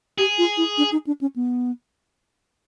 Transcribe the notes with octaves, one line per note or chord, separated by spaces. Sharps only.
G4 G#4
F4
E4
D4
D#4
D4
C#4
B3